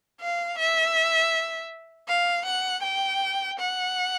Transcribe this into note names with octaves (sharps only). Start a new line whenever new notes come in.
F5
E5
F5
F#5
G5
F#5